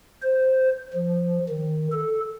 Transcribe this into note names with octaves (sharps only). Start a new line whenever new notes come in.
C5
F3
D#3
A4